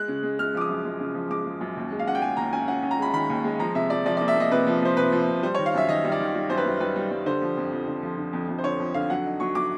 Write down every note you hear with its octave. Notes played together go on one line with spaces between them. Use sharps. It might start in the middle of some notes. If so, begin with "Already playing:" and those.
Already playing: G#3 F#6
C#3
G#3
G#3 F6
F3 D6
D#6
F#2
G#3
C#3
F3
G#3 D6
G#3
F#2
D#2
G#3
F5
C#4 F#5
G5
G#3 G#5
D#2 A#5
C#4 G#5
C#4 F#5
C#4
A#5
G#3 B5
D#3 B5
D#2
G#3
F3 A#5
C3 E5
C3 D5
F3 D5
D5
A#3
E5
A#3 D#5
C3 B4
F3
F3 C5
C3 B4
F3
C3
G3 C5
C#5
D#3
F5
F#2 E5
D#3 D#5
G3
D5
D#3
G3
F#2 C5
B4
F#2
G3 B4
G3
G3
D3 C5
F3
F2
F2
D3
F3
D3
F2
F2
C5
D3 C#5
F2
D3 F5
F#3 F#5
D#4
F#3 C#6
F#3 D6